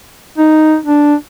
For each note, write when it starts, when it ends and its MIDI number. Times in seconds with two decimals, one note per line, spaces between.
0.38 0.76 63
0.86 1.15 62